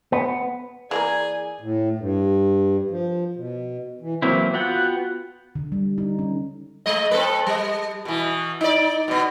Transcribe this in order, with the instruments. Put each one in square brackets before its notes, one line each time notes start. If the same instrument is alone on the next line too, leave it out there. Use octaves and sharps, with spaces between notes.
[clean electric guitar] B3
[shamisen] E3 A#3 A#4 [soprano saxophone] G#4 [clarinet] D5 [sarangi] G#5
[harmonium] A2
G2
F3
B2
E3
[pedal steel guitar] E3 F#3 A#3 C4 E4
B3 F4 F#4 F#5 G5
[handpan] D3
G3
D#4
C#4
[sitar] G#3 D#5
C4 A4 B4
G3
B2 E3
D#4 D5
B2 B3